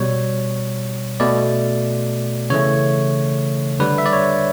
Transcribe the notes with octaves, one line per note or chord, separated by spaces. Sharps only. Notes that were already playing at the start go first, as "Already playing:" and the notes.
Already playing: B2 G3 C#5
B2 A3 D5
C#3 E3 A3 C#5
D3 G3 B4
E5
D5
C#5